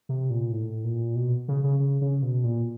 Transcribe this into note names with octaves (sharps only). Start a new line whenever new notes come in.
C3
A#2
A2
A#2
B2
C#3
C#3
C#3
C#3
B2
A#2